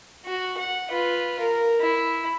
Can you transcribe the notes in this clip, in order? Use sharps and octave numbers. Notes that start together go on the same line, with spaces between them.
F#4
F#5
F4 B4
A#4
E4